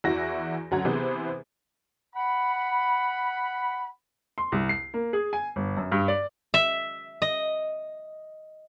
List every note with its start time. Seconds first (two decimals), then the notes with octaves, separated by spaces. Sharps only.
0.04 E2 E3 E4 F#4 A#6
0.71 D2 F#3 C#4 F#5 A#5 G#6
0.85 C3 E3 B3 G#4 B4 C5
2.15 F#5 B5
4.38 C6
4.52 C2
4.69 C7
4.94 A#3
5.13 G#4
5.33 G#5
5.56 G1
5.77 F#2
5.92 G2
6.08 D5
6.54 E5
7.22 D#5